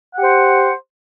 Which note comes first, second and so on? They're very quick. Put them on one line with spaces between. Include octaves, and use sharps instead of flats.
F#5 G4 C5